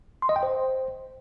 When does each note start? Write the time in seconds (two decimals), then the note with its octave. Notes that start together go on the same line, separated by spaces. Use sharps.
0.22 C6
0.29 D#5
0.36 G5
0.43 C5